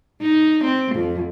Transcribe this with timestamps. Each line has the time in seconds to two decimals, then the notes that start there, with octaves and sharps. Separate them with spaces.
0.22 D#4
0.64 C4
0.96 F2